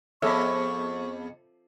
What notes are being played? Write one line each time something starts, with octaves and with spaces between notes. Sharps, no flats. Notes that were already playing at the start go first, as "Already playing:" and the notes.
F2 B3 G#4 A4 C#5 E5 C#6 F6